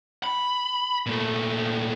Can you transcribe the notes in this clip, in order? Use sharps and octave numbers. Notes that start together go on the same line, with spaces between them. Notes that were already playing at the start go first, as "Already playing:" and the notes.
B5
A#2 A3